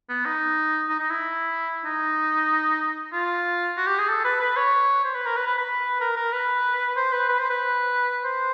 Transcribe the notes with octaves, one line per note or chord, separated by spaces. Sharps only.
B3
D#4
D#4
D#4
E4
D#4
F4
F#4
G4
G#4
A4
B4
B4
C#5
C5
B4
A#4
B4
B4
B4
A#4
A#4
B4
C5
B4
B4
C5
B4
C5